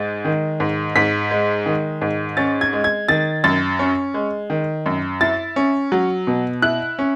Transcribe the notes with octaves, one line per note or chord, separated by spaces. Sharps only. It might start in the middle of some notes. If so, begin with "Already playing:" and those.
Already playing: G#2 G#3 A6
D#3
G#2
G#2 B6
G#3
D#3
G#2
C#4 A6
G#6
G#3
G#6
D#3 A6
F#2 A6
C#4
G#3
D#3
F#2
E4 A6
C#4
F#3
B2
E4 F#6
C#4